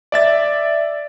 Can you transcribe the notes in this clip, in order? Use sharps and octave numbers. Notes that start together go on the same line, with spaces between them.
D5 E5 A6